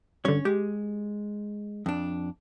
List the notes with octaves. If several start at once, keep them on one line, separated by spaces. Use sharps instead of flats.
G2 D3 C#4 C#5
G#3 G4
F2 D4